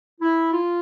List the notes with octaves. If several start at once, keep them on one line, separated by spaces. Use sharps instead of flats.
E4
F4